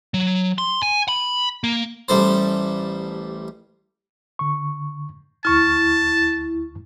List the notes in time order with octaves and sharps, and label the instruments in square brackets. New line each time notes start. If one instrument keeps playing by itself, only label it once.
[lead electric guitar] F#3
C6
G#5
B5
A#3
[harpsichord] A1 G3 A4 C5
[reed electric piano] D3 C#6
[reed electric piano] D2 C#6 F6 [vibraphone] E4 [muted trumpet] A5